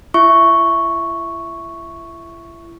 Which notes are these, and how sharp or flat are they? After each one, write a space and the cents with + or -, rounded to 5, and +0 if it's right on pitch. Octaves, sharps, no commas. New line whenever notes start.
E4 +40 E5 +0 C#6 +0